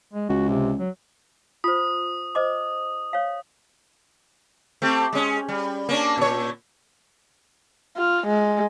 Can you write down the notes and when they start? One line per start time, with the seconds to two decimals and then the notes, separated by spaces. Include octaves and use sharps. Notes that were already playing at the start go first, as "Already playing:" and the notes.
0.13 G#3
0.29 C#2 F#4
0.49 C3
0.79 F#3
1.64 F4 C5 D#6
2.35 C5 D#5 D6
3.13 C#5 F5
4.82 A3 C4 G4
5.13 G#3 C#4
5.49 G3
5.89 A#3 C#4 D4
6.18 A#2 C#5
7.97 F4
8.27 G#3